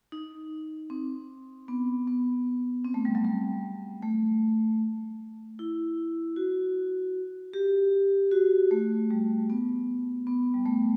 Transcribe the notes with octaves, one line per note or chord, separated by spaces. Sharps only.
D#4
C4
B3
B3
C4
A3
G3
F#3
G3
A3
E4
F#4
G4
F#4
A3
G3
B3
B3
G3
A3